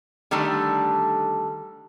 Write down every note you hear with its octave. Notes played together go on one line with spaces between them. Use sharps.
D3 D#3 G3 A3 D4